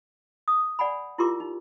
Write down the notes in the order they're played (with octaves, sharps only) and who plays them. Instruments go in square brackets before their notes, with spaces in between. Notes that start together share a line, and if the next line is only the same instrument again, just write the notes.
[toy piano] D#6
D5 F#5 G#5 B5
E4 F4 G4 A#4 C6 D6
D#4